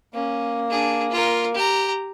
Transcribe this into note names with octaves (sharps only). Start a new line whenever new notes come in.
A#3 C#4
D4 G#4
F4 A#4
G4 A#5